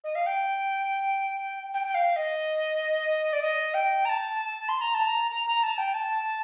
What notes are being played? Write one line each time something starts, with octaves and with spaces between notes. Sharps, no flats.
D#5
F5
G5
G5
G5
F5
D#5
D5
D#5
G5
A#5
A5
C6
A#5
A5
A#5
A#5
A#5
A5
G5
A5